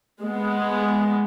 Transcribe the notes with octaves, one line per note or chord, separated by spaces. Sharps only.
G#3 B3